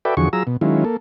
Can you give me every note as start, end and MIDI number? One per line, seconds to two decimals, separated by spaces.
0.05 0.15 66
0.05 0.15 69
0.05 0.15 71
0.05 0.15 74
0.05 0.15 76
0.05 0.15 79
0.17 0.29 40
0.17 0.29 50
0.17 0.29 53
0.17 0.29 66
0.17 0.29 68
0.17 0.29 85
0.33 0.43 54
0.33 0.43 65
0.33 0.43 68
0.33 0.43 82
0.33 0.43 88
0.47 0.57 47
0.61 0.84 51
0.61 0.84 54
0.61 0.84 56
0.61 0.84 61
0.61 0.84 64
0.61 0.84 65
0.85 0.97 58
0.85 0.97 69